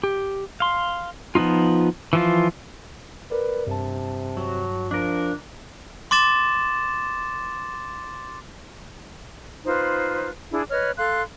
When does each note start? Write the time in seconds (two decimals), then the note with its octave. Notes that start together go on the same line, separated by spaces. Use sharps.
0.04 G4
0.60 F5 C6
1.35 F3 B3 C4 D#4 F4
2.13 E3 F3 F4
3.31 A#4 B4 D5
3.67 G2 C3 A5
4.37 F#3
4.91 F3 D4 A#4
6.11 C6 D6 A6 E7
9.66 D#4 F4 B4 C5
10.52 D4 E4 G#4
10.70 B4 C#5 D#5 F6
10.97 A4 F5 C6 F#6